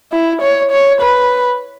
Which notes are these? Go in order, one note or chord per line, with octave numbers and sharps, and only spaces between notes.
E4
C#5
C#5
B4